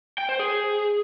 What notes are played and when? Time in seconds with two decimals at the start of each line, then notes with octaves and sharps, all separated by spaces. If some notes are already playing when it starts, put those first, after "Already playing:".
0.18 G5
0.29 C5
0.39 G#4